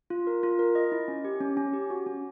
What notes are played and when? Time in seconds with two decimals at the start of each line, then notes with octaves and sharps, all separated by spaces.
0.10 F4
0.27 A#4
0.43 F4
0.59 A#4
0.75 D#5
0.92 E4
1.08 C#4
1.25 G4
1.41 C#4
1.57 C#4
1.73 G4
1.90 F#4
2.06 C#4